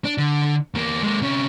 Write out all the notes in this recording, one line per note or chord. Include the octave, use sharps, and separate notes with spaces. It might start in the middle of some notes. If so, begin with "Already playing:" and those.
D4
D3
E2 A#3
G#3 A#3
C3 C#4